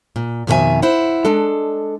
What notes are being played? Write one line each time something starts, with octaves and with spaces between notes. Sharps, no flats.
A#2
F2 B2 D#3 G#4 E5 G#5
E4 C5 F#5
G#3 D4 A4